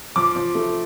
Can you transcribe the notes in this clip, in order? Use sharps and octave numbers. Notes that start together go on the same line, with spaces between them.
F3 D6
F3
A3